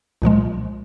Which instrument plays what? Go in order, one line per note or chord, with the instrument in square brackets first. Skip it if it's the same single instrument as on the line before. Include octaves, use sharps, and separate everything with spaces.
[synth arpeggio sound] C2 A#2 F3 G#3